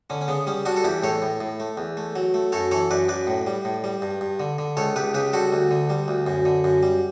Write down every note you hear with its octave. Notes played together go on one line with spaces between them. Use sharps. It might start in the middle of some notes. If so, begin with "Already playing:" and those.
D3 C#4
C#4
C#3 B3
G3 C#4
G3 D4 F#4
A4
E2 E4 G4
A2 A4 C#5
A2
A2
A3
E2
A3
F#3
A3
F#2 A4 C#5
E3 A4 C#5
F#2 B4 D5
F#2 B4 D5
A2
G3
A2
G3
G2
G2
D3
D3
C#2 A4 C#5
C#2 G4 B4
C#3 G4 B4
G3 F#4 A4
D2
D3
G3
D2
F#2
D3
F#2
G3